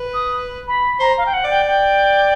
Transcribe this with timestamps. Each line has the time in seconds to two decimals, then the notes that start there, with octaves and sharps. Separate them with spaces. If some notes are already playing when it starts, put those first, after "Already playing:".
Already playing: B4
0.13 D#6
0.67 B5
1.00 C5 A#5
1.17 F5
1.26 G5
1.33 F#5
1.45 D5
1.50 G5
1.67 G5